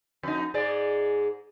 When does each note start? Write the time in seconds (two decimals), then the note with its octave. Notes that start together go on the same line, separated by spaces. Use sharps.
0.23 F2 D#4
0.54 G#2 G#3 D5